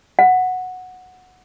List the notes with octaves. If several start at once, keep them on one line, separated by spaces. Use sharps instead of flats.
F#5